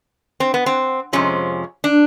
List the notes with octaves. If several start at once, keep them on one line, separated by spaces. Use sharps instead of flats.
C4
B3
C4
F2 C3 F3 G#3 C#4
D4